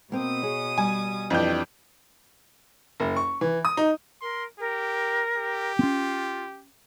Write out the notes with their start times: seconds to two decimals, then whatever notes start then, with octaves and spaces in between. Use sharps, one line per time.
0.12 B2 A#3 C4 D#6
0.43 G#4 C#5
0.78 G3 G#5
1.30 F2 E3 D4 G4 G6
3.00 F#1
3.16 C#6
3.41 E3
3.65 D#6
3.77 D#4
4.22 A#4 C6
4.59 G4 A#4
5.37 G4
5.79 C4 C#4 F4